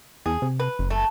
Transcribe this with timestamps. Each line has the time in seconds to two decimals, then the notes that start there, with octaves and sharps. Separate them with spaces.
0.26 E2 G#4
0.42 C3
0.60 B4
0.79 F#1
0.90 A3